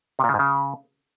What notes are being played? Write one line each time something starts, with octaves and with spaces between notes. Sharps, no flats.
C3
A#2
C#3
G#2
C#3